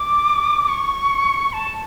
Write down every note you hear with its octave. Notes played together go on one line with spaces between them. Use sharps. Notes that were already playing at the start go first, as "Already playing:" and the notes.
Already playing: D6
D6
C#6
A5